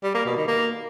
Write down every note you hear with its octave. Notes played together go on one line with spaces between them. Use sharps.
G3
A#3
B2
D#3
A#3